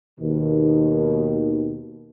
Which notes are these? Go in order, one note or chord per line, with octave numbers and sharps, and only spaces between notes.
D#2 B2 D#3